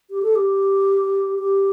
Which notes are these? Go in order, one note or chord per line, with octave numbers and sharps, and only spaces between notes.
G4
A4
G4
G4